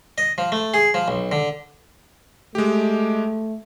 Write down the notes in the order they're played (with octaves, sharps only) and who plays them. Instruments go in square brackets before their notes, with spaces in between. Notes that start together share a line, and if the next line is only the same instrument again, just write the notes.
[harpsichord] D#5
F3
A3
G#4
F3
B1
D3
[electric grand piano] G#3 G4 [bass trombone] A3